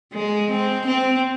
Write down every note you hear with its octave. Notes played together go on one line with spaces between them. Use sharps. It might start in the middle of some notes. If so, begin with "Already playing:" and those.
G#3
C4
C4